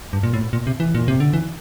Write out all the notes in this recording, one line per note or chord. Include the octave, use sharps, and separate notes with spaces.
G2
A#2
A2
A#2
C3
E3
A#2
C3
D3
E3